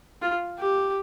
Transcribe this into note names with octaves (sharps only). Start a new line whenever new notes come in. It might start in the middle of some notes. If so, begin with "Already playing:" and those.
F4
G4